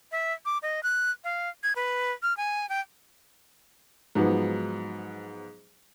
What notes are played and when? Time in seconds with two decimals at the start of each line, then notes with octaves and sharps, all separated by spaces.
0.12 E5
0.45 D6
0.62 D#5
0.83 F#6
1.24 F5
1.63 G#6
1.76 B4
2.22 F6
2.37 G#5
2.69 G5
4.15 G#2 F3 F#3 B3